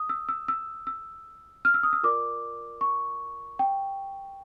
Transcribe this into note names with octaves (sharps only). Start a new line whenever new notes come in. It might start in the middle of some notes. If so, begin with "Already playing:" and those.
Already playing: D#6
E6
E6
E6
E6
F6
E6
D#6
E6
F4 A#4 D5 D6
C#6
G5